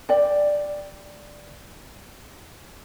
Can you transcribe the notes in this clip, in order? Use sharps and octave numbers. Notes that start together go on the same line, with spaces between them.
D5 G5